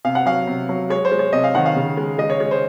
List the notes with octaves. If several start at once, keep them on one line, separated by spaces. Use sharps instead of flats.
C3 F5
F#5
F#3 F5
C3
F#3
G#3 C#5
C5
G#3
C#5
C3 D#5
F5
D#3 F#5
F5
C#3
G#3
G#3 D#5
C#5
G#3 C#5
C5